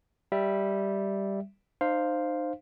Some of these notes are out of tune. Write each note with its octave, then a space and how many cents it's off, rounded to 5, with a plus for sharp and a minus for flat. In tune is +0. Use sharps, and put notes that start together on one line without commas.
G3 +0 E5 +0
D#4 -35 C5 +0 F5 +0